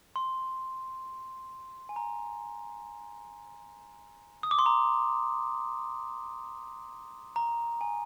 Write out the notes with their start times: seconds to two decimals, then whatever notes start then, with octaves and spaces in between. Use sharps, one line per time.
0.16 C6
1.89 G#5
1.96 A#5
4.43 D#6
4.51 D6
4.59 C6
4.66 A#5
7.36 A#5
7.81 G#5